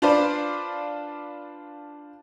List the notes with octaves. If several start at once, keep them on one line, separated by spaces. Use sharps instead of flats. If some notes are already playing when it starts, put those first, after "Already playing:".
D4 F4 B4 C5 D5